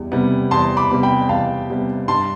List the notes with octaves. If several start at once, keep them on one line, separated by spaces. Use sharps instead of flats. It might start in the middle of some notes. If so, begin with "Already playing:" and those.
Already playing: E2 G3
C3 G3 B3
E2 A5 C6
B5 D6
C3 G3 B3
G5 B5
E2 F5 A5
C3 G3 B3
G2 A5 C6